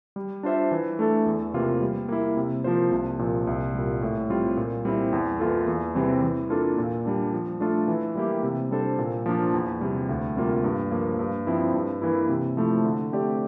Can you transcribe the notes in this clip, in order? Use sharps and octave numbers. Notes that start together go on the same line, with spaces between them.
G3
D4 F4 C5 E5
E3
A3 D4 A4
E2
C3 E3 A#3 F4
G3
A#3 E4
C3
F3 A#3 F4 C5
C2
A#2 F3
C2
A#2 G3
A2
G3 C4 F4
A#2
G3 C4 E4
E2
E3 A#3 F4 A4
E2
C3 E3 G3 C4
E3
A#3 D4 F4 A4
A#2
G3 D4
F3
A3 D4 F4 A4
E3
G3 A#3 E4 G4
C3
G3 D4 A4 C5
A#2
F3 A#3 D4 F4
E2
C3 G3
D2
C3 G3 A#3 F4
G2
F3 A#3
G2
F3 C4 E4
G2
E3 A#3 E4
C3
F3 A3 E4
D3
A3 C4 G4 D5